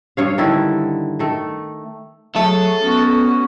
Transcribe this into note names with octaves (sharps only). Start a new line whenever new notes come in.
G2 C#5 F5
D3 D#3 E4
D#3 A3
F#3 A3 G#4 A4 C#5
B3 C#4 F#4